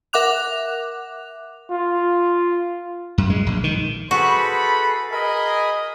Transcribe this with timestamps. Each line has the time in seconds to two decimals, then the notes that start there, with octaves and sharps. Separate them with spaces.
0.13 A#4 E5 F#5 D6 F#6 F7
1.71 F4
3.18 F#2
3.30 G#3
3.47 A#1
3.64 D#3
4.11 F#4 G#4 A4 B4 C5 B5
5.11 G#4 A#4 D#5 B5